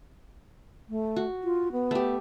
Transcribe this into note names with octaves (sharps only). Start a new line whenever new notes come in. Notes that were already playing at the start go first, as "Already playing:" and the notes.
A3
F#4
F4
B3
A3 G4